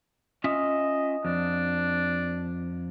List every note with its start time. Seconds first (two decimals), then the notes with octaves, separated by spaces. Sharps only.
0.44 C#4 F4 D#5 E5
1.25 F2 D4